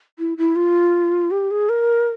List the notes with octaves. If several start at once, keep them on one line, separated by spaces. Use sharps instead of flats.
E4
E4
F4
G4
G#4
A#4